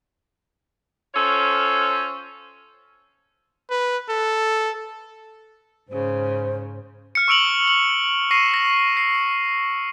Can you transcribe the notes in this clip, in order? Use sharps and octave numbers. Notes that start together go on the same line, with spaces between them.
C#4 F4 A4 C5 C#5
B4
A4
G#2 C#3 C5
F6 C#7
C#6 E6 D7 F7 F#7
F#7
C#6 A#6 C7 D#7
A#6
C7